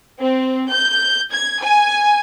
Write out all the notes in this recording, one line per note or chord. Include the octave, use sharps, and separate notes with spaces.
C4
G6
G#6
G#5